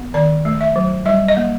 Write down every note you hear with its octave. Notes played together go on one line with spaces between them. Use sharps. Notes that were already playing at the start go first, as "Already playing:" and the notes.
Already playing: B3
D#3 D5
A3
E5
F#3
G3 E5
D#5
A#3